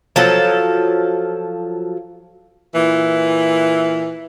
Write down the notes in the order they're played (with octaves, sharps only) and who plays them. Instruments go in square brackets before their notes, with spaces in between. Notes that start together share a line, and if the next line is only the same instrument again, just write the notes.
[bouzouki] F3 F#3 A4
[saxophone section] A#2 E3